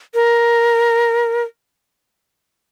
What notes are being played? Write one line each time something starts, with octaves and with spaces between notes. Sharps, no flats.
A#4